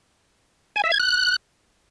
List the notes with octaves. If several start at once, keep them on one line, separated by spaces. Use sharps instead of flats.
G#5
E5
G#6
F#6